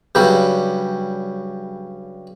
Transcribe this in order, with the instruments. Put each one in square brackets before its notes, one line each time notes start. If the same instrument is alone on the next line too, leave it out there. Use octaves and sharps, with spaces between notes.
[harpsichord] G2 C#3 F#3 G3